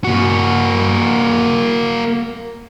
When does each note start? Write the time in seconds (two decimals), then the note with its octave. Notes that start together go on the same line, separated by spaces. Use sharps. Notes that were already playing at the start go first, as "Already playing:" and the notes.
0.04 A#3 F#4